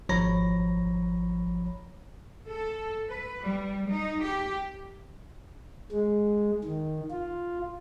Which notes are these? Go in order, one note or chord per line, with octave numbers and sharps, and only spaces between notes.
G#1 F3 C#5 A#5 B5 A#6
A4
B4
G3
D#4
G4
G#3
D#3
F4